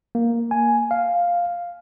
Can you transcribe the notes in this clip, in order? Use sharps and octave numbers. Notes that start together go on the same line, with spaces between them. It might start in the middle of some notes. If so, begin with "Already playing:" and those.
A#3
G#5
F5